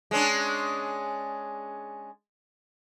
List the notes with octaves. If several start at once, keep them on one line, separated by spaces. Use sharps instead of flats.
G#3 C#4 D4